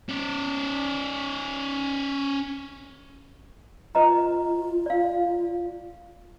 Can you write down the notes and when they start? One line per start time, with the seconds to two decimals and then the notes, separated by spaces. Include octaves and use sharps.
0.09 C#4 D5
3.95 F4 B4 D#5 A#5
4.86 D5 F5